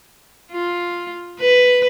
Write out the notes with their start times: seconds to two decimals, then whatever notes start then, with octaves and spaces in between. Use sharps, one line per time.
0.52 F4
1.40 B4